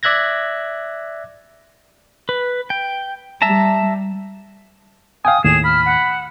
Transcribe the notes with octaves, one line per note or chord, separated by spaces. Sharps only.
D5 E5 F#6 G#6 A#6
B4
G5
G3 E5 A5 A#5
F5 G5 G#5 D#6
D#2 A2 G#4 E7
B5 F6
F#5